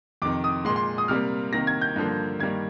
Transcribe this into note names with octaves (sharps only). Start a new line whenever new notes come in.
F2 C3 D#3 D6
D#6
A#2 G#3 C6
C6
D#6
C3 G3 A#3 F6
C3 D#3 A#3 A#6
G#6
G6
G2 D3 F3 A#3
G2 D#3 G3 A#3 G#6